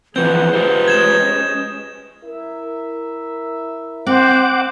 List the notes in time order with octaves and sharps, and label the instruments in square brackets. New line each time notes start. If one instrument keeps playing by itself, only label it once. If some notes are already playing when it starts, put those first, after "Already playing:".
[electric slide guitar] E3 F3 C4 [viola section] G#4 F#5 [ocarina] B4 [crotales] G6
[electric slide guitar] F4 G4 C5
[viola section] G#3 C#4 D#5 [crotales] G#6 E7
[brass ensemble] E4 A#4 E5
[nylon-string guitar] C4 [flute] C5 [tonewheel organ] F#5 D6